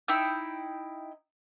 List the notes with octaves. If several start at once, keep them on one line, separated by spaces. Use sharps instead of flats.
D#4 E4 G5 E6